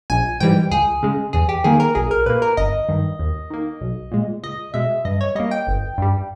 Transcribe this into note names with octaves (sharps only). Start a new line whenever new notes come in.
A#1 G#5
G#2 E3 G3 G5
C#2 G#4
C#3 G#3
E2 G#4
G4
D#3 A#3 G#4
A#4
B1 G#4
A#4
A#2 A#3 B4
A#4
G1 D#5
G2 D#3
D#2
D#3 A#3
B1
A#2 G#3
C#2 D#5
B2 G#3 E5
G2 D#5
C#5
G3 A#3 D#5
G5
G1
G2 G3